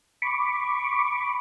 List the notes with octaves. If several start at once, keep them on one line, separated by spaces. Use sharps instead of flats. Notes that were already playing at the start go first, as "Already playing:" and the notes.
B5 C#6 D6